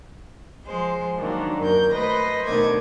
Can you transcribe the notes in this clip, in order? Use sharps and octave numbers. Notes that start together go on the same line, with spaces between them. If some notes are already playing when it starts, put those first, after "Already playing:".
F3 G#3 C5
D#3 F#3 A#3 D4
F#2 A#4 G6
A3 B4 C5 D#5 C6 A#6
B2 D3 D#3 A3 D6 G#6